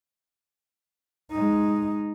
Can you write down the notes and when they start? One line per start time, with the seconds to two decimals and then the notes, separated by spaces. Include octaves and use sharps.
1.31 G#3 D#4